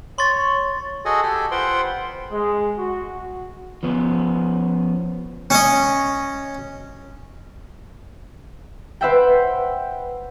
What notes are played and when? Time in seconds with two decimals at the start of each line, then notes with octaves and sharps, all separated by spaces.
0.18 C#5 C6 C#6 A6
1.05 F#4 G#4 A4 D#5 F#5 G#5
1.23 G4 A4 G#5
1.51 F4 B4 C5 F#5 G5 C6
2.31 G#3
2.78 F#4
3.83 F3 B3 C#4
5.50 C#4 D#5
9.01 B4 C5 E5 F#5 G5